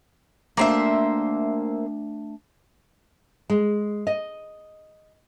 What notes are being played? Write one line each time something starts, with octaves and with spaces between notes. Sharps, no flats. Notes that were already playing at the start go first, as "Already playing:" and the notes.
A3 A#3 D4 C5 E5
G#3
D#5